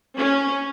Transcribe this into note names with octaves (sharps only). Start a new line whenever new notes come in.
C#4